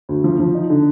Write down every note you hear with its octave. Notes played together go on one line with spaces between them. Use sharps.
D2
F3
F3
D#4
D3